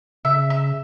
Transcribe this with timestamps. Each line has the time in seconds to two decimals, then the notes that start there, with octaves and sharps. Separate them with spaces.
0.25 C#3 E5
0.50 E5